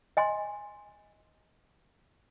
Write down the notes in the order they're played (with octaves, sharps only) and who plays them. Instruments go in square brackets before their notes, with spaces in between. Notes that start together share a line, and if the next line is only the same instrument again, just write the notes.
[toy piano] D#5 G#5 C6